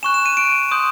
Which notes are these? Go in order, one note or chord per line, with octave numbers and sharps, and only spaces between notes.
G#5 C#6 F#6 E7
E7
D#7
D7
C6 D#6 G6